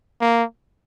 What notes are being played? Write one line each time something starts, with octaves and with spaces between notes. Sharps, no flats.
A#3